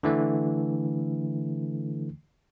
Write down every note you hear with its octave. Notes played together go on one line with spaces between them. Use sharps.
D3 E3 A3